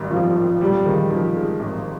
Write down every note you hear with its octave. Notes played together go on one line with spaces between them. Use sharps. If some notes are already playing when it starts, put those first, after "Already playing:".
Already playing: G#1 D#3 G3
G#1 F3
G#1
A#2 G3
D#3 G#3
F3
G#3
G#1